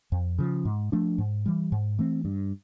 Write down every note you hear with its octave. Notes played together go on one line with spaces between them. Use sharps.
F2
C#3 F3
G#2
F3 A3 D4
G#2
E3 G3
G#2
E3 A3 C4
G2